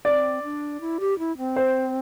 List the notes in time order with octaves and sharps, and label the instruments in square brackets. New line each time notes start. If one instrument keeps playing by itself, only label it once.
[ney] D4 [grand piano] D5
[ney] C4
D4
E4
G4
E4
C4
[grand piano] C5